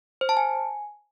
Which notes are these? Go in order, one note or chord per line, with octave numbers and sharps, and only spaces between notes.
C5
A5
G#5